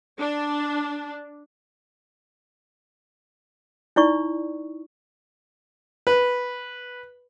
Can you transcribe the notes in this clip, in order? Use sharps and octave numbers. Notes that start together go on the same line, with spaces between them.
D4
D#4 E4 D5 C#6
B4